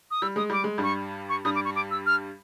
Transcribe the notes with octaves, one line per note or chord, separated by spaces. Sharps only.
D#6
G3 E6
G#3 D#6
G3 D6
G#3
G2 G3
C#6
C#6
G2 G3 D#6
D6
C#6
D6
E6
F6